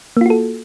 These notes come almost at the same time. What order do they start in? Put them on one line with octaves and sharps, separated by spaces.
A#3 F4 F#4 A4